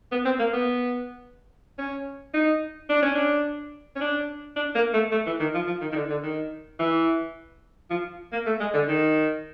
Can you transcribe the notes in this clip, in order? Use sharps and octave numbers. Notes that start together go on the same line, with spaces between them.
B3
C4
A#3
B3
C#4
D#4
D4
C#4
D4
C#4
D4
D4
A#3
A3
A3
E3
D#3
F3
F3
D#3
D#3
D3
D3
D#3
E3
F3
A#3
A3
G#3
D3
D#3